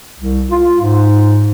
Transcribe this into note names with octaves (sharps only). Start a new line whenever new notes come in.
C2
F4
G#2